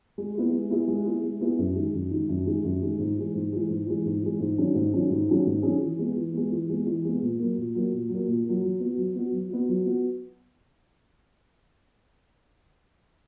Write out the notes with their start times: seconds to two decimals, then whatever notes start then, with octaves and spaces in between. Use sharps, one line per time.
0.18 G#3
0.35 B3 E4 G#4
0.53 G#3
0.70 B3 E4 G#4
0.88 G#3
1.05 B3 E4 G#4
1.23 G#3
1.41 B3 E4 G#4
1.58 F#2
1.76 D#3 G#3
1.94 F#2
2.11 D#3 G#3
2.29 F#2
2.46 D#3 G#3
2.64 F#2
2.81 D#3 G#3
2.99 G#2
3.17 E3 G#3
3.35 G#2
3.52 E3 G#3
3.69 G#2
3.86 E3 G#3
4.05 G#2
4.22 E3 G#3
4.40 G#2
4.58 D#3 F#3 C#4 G#4
4.74 G#2
4.92 D#3 F#3 C#4 G#4
5.10 G#2
5.28 D#3 F#3 C#4 G#4
5.46 G#2
5.62 D#3 F#3 C#4 G#4
5.80 E3
5.98 G#3 B3
6.16 E3
6.33 G#3 B3
6.52 E3
6.69 G#3 B3
6.86 E3
7.05 G#3 B3
7.22 A#2
7.39 F#3 A#3
7.57 A#2
7.75 F#3 A#3
7.93 A#2
8.09 F#3
8.14 A#3
8.27 A#2
8.44 A#3
8.49 F#3
8.63 F#3
8.80 B3 F#4
8.97 F#3
9.15 B3 F#4
9.32 F#3
9.50 B3 F#4
9.69 F#3
9.86 B3 F#4